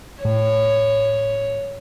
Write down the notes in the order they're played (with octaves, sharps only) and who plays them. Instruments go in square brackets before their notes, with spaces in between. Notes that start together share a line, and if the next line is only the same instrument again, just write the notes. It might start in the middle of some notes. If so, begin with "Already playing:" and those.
[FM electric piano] A2 [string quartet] C#5